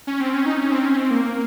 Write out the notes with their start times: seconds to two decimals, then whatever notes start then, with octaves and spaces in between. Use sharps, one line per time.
0.07 C#4
0.20 C4
0.34 C#4
0.46 D#4
0.58 C#4
0.72 C4
0.84 C#4
0.97 C4
1.11 A#3